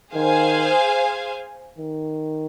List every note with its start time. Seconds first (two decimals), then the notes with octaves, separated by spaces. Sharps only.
0.14 D#3 G#4 C5 F5 G#5
1.78 D#3